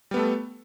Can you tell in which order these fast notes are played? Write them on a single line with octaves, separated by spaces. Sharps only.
G3 B3 A3 A4